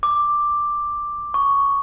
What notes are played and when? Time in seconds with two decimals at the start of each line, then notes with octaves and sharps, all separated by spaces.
0.03 D6
1.34 C#6